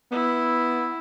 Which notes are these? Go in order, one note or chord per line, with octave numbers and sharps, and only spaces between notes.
B3 E4